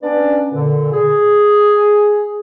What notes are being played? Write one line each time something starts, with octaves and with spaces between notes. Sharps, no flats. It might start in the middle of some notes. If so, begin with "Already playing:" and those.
B3 C#4 D4 B4 D5
A#2 D3
G#4